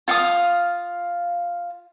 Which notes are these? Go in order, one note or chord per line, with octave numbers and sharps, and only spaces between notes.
F4 F5 F#5 D#6